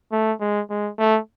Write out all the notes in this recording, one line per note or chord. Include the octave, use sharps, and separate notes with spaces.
A3
G#3
G#3
A3